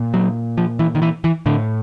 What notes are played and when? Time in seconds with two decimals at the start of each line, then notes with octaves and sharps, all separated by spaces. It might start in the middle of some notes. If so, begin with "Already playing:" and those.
Already playing: A#2
0.14 F#3
0.58 F3
0.79 E3
0.95 D#3
1.02 E3
1.24 E3
1.46 A2 D3